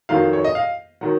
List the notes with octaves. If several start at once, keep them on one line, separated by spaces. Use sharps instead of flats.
F2 D#3 F#3 F5
C#5
D#5
F5
D#3 F#3 F#5